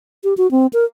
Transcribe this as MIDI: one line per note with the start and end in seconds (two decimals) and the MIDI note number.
0.24 0.34 67
0.37 0.50 66
0.51 0.67 60
0.73 0.84 70